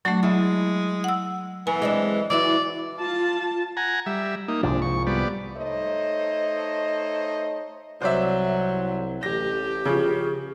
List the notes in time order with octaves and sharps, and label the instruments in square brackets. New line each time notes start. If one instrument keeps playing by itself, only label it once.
[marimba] F#3 A3 [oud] D4 [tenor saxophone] F#4
[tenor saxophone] G#3 [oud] E4
[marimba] F#5 E6
[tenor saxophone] E3 [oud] B3 [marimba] G#5
[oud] G#3 C4 D4
[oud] E3 F#3 E4 [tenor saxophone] D5
[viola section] F4 A5
[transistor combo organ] F#5 G#5 A#5
G3 E5
A#3 D#4
[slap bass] C2 G#2 F3 [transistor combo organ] D4
[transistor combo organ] C#6
G3 B3 D5
[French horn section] A3 D#4 C5 C#5 D#5
[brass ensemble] C2 [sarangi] F#3 [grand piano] C5 D5 E5
[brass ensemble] A1 [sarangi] G4 [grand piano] A#6
[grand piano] C#3 F3 [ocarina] G#4